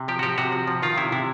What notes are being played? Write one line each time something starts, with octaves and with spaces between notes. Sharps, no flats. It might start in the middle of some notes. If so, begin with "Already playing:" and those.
Already playing: C3
F3 G4
F#4
F3 G4
C3 F#4
F3
F3
D#3 F4
C3 E4
C3 E4